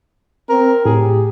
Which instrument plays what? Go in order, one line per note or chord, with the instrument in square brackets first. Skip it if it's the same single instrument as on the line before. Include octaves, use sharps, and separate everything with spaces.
[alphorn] C4 [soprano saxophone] A#4
[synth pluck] A2 [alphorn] G4 [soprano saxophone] G#4